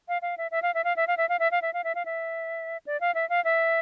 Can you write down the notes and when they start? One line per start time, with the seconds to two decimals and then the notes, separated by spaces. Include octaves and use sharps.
0.08 F5
0.22 F5
0.38 E5
0.51 E5
0.62 F5
0.74 E5
0.84 F5
0.96 E5
1.07 F5
1.17 E5
1.29 F5
1.39 E5
1.51 F5
1.62 E5
1.74 F5
1.84 E5
1.95 F5
2.05 E5
2.87 D5
3.01 F5
3.15 E5
3.29 F5
3.45 E5